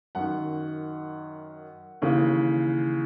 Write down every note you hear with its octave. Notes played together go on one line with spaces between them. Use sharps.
F#2 D#3 F#5
D#2 C#3 E3